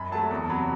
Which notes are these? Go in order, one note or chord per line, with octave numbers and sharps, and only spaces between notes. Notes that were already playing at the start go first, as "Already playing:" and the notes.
Already playing: F#2 B5
F#3 A3 A5
E2
C3 F#3 B5